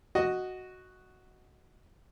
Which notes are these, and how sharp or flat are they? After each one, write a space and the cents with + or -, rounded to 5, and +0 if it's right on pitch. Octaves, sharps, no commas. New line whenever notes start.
F#4 +0 D#5 +0